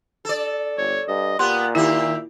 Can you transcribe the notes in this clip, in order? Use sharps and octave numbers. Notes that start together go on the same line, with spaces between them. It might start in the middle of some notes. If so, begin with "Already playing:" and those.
A4 D5
G1 C#5
G2 D#5
A#2 B3 G4 F#5 C6
D#3 E4 G4 E5